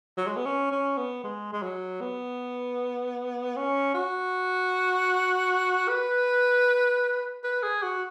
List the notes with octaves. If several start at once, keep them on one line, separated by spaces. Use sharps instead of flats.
F#3
G#3
B3
C#4
C#4
B3
G#3
G#3
F#3
B3
C#4
F#4
B4
B4
G#4
F#4